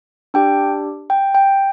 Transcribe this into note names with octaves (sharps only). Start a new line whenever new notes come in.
D4 G4 G5
G5
G5